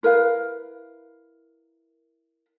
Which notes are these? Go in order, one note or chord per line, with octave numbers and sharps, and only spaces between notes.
E4 A#4 B4 F5